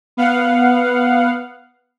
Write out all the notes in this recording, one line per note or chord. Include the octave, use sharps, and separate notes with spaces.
B3 F5 F#5